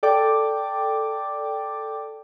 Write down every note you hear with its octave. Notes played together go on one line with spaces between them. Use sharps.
A4 D5 G5 D6